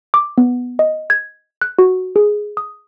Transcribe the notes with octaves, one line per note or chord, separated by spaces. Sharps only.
D6
B3
D#5
G#6
F#6
F#4
G#4
D#6